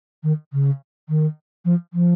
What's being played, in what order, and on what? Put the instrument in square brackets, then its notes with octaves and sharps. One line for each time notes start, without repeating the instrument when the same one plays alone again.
[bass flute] D#3
C#3
D#3
F3
F3